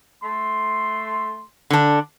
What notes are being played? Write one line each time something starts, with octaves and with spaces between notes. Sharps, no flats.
A3 C6
D3 D4